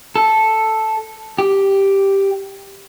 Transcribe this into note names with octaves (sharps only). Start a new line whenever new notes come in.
A4
G4